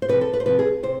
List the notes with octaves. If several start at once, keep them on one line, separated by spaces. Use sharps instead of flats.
C5
C3 F3 B4
A4
B4
C5
C3 F3 B4
G#4
C3 C5